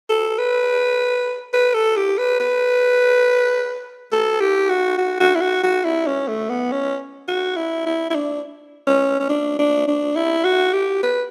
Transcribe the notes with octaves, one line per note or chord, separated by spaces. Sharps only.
A4
B4
B4
A4
G4
B4
B4
A4
G4
F#4
F#4
F#4
E4
F#4
F#4
E4
C#4
A3
B3
C#4
F#4
E4
E4
E4
D4
C#4
C#4
D4
D4
D4
E4
F#4
G4
B4